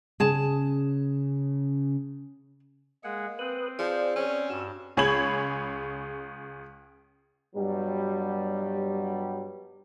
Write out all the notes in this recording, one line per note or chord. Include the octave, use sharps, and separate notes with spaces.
C#3 G#4 A5
G#3 A#3 G#4 F#5
C4 B4 D#6 F#6
F3 G#4 C5 D5
C#4
G2 F#4 E6
C#2 G#4 C#5 B5 G#6 F#7
G2 B2 F#3 G3